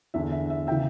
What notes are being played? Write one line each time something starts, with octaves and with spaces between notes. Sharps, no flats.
E2 D3 E5
E5
E5
C#3 E3 E5 G5